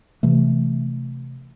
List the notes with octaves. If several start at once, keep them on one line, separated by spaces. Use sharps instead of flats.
C3 E3 A3